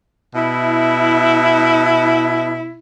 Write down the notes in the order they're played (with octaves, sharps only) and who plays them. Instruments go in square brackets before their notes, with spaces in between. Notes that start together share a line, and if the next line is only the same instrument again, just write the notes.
[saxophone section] B2 E4